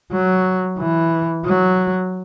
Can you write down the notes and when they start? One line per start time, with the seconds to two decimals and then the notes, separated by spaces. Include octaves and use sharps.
0.12 F#3
0.78 E3
1.45 F#3